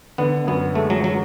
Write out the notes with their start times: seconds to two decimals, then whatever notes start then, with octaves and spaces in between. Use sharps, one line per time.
0.18 D3 B3
0.47 F#2 B3
0.75 G#3 A3
0.90 F#3
1.04 F#3